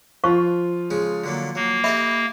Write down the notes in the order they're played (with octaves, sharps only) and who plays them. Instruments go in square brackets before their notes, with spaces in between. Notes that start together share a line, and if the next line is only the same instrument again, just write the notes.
[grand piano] F3 F4 [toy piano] C5 F5 C#6
[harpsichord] C#3 G#3 G#4
D3 F#3 A#3
[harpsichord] F#3 [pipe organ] A#3
[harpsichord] G4 A4 D#5 [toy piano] E5 B5